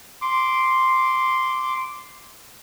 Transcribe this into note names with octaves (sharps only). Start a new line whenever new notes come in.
C6 D6